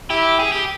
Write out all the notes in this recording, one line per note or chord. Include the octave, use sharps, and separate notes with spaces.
E4 G4
G#4
G4